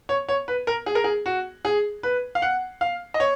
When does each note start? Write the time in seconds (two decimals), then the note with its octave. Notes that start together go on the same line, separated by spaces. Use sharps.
0.09 C#5
0.29 C#5
0.48 B4
0.67 A#4
0.86 G#4
0.95 A#4
1.04 G#4
1.26 F#4
1.65 G#4
2.03 B4
2.35 F5
2.42 F#5
2.81 F5
3.14 D#5
3.20 C#5